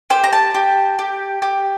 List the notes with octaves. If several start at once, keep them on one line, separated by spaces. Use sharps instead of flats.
G4 C5
A#5
A5
G4
G4
G4